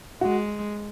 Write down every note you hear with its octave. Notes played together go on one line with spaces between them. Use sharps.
G#3 F#4